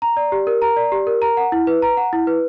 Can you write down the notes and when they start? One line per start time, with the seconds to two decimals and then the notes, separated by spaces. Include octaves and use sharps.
0.02 A#5
0.17 D5
0.32 G4
0.47 A#4
0.62 A#5
0.76 D5
0.92 G4
1.07 A#4
1.22 A#5
1.37 F#5
1.52 E4
1.67 B4
1.82 A#5
1.97 F#5
2.13 E4
2.27 B4